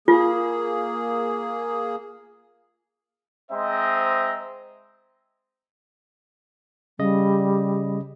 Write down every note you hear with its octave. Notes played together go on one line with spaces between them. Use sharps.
A#3 F4 G#4
G#3 C4 C5 D#5 E5 A#5
C#3 G3 D#5